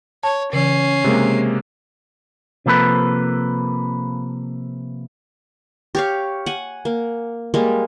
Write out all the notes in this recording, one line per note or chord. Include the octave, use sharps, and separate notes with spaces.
C#5 A5
C#3 E3 C#4 C7
C3 G#3 A#3
C3 F3 A#3 A4 B4
G4 C#5 F5
F#5 G#5
A#3
G3 G#3 A#3